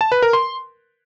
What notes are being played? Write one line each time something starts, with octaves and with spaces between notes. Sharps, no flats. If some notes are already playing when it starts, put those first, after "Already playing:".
A5
B4
A#4
C6